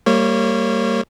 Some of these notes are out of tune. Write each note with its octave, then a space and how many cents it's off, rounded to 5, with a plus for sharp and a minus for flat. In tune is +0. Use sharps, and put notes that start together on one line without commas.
G3 +0 A#3 -25 C#5 -25